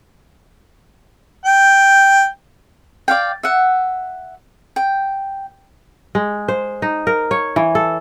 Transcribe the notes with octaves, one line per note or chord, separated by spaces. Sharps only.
G5
D5 F5 G5
E5 F#5
G5
G#3
C5
D#4
A#4
C#5
E3
A4